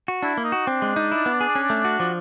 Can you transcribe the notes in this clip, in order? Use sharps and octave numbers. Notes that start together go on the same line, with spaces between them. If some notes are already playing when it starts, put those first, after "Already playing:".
F#4
D4 E4
A#3
D#4
F#4
C4 D4
G#3
D#4
E4
B3
G#4
C#4
A3
F#4
F3